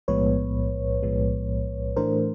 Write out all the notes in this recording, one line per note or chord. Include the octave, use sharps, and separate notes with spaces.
B1 A2 F3 G#3 B3 B4 C#5
B1 A2 F3 G#3 B3
A2 E3 A3 D4 A#4 C5